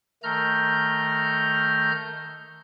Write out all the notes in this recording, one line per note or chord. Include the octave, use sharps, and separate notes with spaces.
D#3 A3 A#5 F6 G6